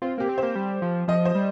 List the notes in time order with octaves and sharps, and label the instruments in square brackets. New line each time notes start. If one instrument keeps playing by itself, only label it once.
[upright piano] C4 [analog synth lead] F4
[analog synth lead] A#3 [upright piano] G4
[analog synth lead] C4
[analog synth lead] A#3 [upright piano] C5
[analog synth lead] G3
F3
[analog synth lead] F3 [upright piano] D#5
[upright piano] C5
[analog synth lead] G3